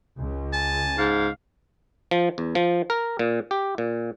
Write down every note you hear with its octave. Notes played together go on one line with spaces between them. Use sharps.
C#2
G#5 A5
G#2 F5
F3
E2
F3
A#4
A#2
G4
A#2